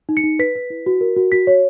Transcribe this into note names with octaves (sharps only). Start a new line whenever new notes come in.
D#4
C#7
D#4
B4 B6
B4
E4
F#4
A#4
F#4
F#4 B6
C#5